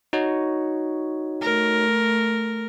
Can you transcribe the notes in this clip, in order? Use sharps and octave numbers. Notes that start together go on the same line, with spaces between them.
D#4 F#4 C#5
A3 A#4